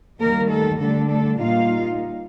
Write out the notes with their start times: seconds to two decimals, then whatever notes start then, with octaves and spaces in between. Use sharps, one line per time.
0.19 D#2 D#3 G3 A#3 A#4
0.49 A3 A4
0.80 D3 G3 A3 D4 A4
1.09 A3 A4
1.39 A#2 G3 A#3 D#4 F4 F5